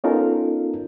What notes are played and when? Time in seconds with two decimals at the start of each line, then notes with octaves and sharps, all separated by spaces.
0.04 B3 C#4 D#4 F4 A4 A#4